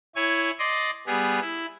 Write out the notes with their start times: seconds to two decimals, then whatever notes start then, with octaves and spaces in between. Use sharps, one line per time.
0.16 E4 C#5 G#5
0.59 D5 D#5 C6
1.07 G3 B3 G#4
1.41 E4